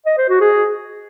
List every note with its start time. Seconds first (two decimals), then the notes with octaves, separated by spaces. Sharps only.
0.06 D#5
0.18 C5
0.29 F#4
0.41 G#4